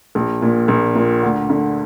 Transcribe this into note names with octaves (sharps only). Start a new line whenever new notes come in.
A#1
A#2
A#1
A#2
D2
D3